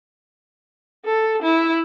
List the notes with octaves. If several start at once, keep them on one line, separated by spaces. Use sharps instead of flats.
A4
E4